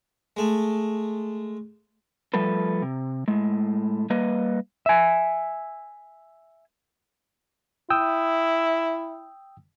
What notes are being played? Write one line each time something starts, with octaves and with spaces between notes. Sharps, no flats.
G#3 A3
F3 G3 A3 A4 B4
C3
A2 G#3
G3 A#3 B4 D#5
E5 G#5
E4 G5 D#6 E6